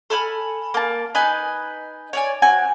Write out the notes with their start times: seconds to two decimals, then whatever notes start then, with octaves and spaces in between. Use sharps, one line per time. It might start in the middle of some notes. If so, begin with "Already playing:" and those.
0.10 A4 G#5 B5 F6
0.74 A#3 A5
1.15 D#4 B4 D#5 G#5
2.13 C#5 D5 G#5
2.42 C4 F#4 G#5